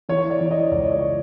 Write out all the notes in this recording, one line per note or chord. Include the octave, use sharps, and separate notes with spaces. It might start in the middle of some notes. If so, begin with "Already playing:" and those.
E3 C#5
D5
E3
D#5
C#2 D5
C#5